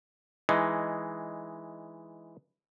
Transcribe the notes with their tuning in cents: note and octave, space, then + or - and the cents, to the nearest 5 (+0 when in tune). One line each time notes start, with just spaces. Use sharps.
E3 +0 G#3 +0 D#4 +0